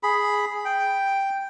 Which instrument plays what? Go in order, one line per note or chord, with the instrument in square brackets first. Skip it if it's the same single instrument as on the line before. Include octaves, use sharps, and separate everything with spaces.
[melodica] G#4 B5
G5